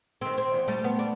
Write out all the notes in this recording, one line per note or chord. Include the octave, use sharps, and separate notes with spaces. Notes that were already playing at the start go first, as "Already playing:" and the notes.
D#3 C4
C4
E2
G3 A3
B3
D4